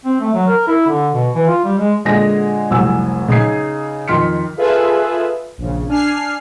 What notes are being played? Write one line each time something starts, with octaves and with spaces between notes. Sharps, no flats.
C4
A3
F#3
A#4
E4
D3
B2
E3
F4
G3
G#3
A#2 D3 G#3 G#4 A#6
F1 C2 F#3 G#5 E6
C#3 D#4 D#6 G#6 C7
F2 D#3 C6 F6 B6 C#7
F4 G#4 A4 B4 E5
A#1 C#3
D4 G#5 F6 C7